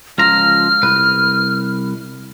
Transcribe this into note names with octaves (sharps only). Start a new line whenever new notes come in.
C#2 F3 A#5 F6
C2 B4